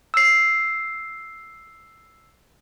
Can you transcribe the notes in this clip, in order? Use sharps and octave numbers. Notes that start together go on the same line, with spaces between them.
E6 C7